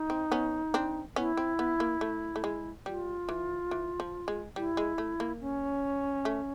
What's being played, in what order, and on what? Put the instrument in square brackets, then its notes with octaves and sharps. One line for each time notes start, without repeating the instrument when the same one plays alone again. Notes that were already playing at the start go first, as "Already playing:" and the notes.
Already playing: [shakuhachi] D#4
[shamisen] C4
B3 C#4
C4 D4
[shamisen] B3 C#4 [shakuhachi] E4
[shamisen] C4
B3
A#3
A3
A3
G#3
[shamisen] G3 [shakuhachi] F4
[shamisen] E3
E3
F3
G#3
[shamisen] G3 [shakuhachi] E4
[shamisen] G#3
A3
A#3
[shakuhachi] C#4
[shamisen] A3